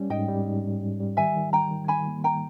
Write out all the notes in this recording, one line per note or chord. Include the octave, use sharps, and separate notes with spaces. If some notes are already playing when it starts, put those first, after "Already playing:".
Already playing: G3 C#4
G#2 D#5 G5
G3
G#2
G#2
G#2
G3
D#3 E5 G#5
D#3
G3 G5 A#5
D#3
D#3 G#5 B5
A#3
G3 G5 A#5